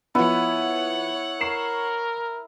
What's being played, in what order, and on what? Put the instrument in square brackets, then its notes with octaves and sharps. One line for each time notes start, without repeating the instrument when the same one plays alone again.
[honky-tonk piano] F3 B3 [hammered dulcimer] E4 [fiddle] C#5 F#5
[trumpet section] A#4 [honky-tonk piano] C#6 C7 E7